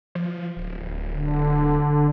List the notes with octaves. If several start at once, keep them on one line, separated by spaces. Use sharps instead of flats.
F3
D1
D3